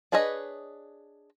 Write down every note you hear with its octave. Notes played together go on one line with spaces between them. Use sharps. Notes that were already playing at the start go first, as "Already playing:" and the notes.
D4 G#4 B4 C#5 D#5